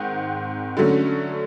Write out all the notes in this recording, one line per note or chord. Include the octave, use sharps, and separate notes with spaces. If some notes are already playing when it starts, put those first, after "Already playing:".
Already playing: G#2 D#3 C4 F#5
D3 F#3 A3 C#4